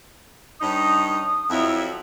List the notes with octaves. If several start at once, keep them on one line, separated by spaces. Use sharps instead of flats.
G2 C#4 D#4 D#6
F2 F#3 E4